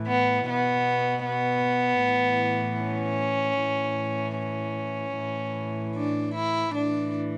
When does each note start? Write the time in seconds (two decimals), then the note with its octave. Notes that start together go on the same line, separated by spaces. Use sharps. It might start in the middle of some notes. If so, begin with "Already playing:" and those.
Already playing: A2 E3
0.09 B3
0.49 B2 B3
1.27 B3
2.04 A2 E3
2.83 C#4
3.60 A2 E3
4.38 C#4
5.17 A2 E3
5.95 D4
6.33 E4
6.72 A2 E3 D4